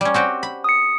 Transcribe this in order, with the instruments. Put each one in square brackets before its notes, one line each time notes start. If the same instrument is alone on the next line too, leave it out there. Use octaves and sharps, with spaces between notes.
[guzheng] G3 C#4
C4 F#4 G4
B5
[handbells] D#6 C#7